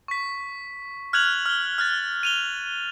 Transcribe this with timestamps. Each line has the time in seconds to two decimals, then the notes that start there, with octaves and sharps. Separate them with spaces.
0.08 C#6 B6
1.13 F6 F#6 G#6 F7 F#7
1.46 F6 G7
1.78 F6 F#6 A6
2.23 D#7 F7 G7